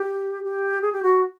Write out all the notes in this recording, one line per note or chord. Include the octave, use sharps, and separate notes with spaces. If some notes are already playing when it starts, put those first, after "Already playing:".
Already playing: G4
G4
G#4
G4
F#4